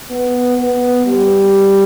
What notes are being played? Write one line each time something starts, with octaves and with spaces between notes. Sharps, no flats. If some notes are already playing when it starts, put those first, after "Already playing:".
B3
B3
G3